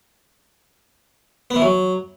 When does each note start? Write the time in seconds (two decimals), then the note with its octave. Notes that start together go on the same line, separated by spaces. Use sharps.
1.51 B3
1.56 E3
1.62 F#3